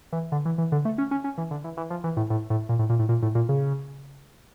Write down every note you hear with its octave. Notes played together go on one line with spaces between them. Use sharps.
E3
D3
E3
E3
D3
A3
C#4
C#4
C#4
E3
D3
E3
E3
F3
E3
A2
A2
A2
A#2
A2
A#2
A2
A#2
A2
A#2
C#3